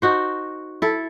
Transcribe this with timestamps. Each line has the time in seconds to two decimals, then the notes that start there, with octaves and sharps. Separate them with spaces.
0.02 D#4 F#4 C5
0.82 E4 A4